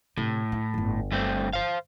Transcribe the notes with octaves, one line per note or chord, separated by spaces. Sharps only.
A2 C3
E4
D1 G1
G2 A3 C4
C5 F5